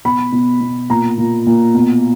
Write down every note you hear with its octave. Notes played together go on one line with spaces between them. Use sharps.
B2 B5
B2
B2
A#2 A#5
A#2
A#2
B2